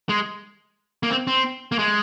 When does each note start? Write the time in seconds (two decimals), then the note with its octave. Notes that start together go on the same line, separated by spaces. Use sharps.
0.09 G#3
1.03 A#3
1.10 C4
1.27 C4
1.72 A#3
1.79 G#3